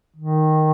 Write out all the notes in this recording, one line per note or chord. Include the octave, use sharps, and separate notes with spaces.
D#3